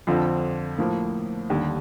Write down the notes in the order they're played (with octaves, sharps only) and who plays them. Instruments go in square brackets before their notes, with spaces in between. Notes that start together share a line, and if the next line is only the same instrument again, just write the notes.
[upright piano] F2 D3 F3 C4 F4
A2 F3 A#3
D#2 D3 G3